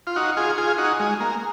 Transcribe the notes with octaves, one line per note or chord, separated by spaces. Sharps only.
F4
D#4 F#4
F4 G#4
F4 G#4
D#4 F#4
G#3
A#3